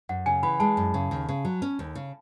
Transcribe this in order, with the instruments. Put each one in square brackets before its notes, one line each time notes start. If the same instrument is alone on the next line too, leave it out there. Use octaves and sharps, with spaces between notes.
[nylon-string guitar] F#2 [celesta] F#5
[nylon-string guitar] C#3 [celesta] G#5
[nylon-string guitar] E3 [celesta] B5
[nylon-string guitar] G#3 [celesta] A5
[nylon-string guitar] F#2
C#3
D#2
C#3
F#3
C#4
D#2
C#3